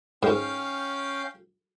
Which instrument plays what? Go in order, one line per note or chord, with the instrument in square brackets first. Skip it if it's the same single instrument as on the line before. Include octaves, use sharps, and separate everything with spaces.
[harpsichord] G#2 [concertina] C#4 F5 G5